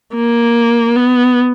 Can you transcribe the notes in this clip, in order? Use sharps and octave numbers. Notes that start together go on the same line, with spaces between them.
A#3
B3